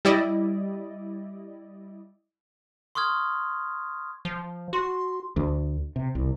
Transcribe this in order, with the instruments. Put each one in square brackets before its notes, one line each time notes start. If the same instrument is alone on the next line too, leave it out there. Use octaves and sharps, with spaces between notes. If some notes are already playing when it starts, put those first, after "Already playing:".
[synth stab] G3 E4 D5 D#5
[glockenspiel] C6 C#6 D#6 F6 G#6
[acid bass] F3
[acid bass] F#4 [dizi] C6
[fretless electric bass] D2
C3
C2